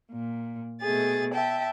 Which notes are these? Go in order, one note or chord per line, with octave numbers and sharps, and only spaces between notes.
A#2
B2 A3 G#4 A6
E5 G5 A5